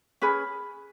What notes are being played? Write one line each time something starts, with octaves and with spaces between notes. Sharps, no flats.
C#4 G#4 B4 B5